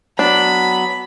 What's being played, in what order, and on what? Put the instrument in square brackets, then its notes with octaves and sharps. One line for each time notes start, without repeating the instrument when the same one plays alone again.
[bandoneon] F#3 B3 [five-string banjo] D4 [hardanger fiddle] B5